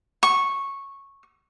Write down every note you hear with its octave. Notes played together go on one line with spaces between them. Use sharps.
C#6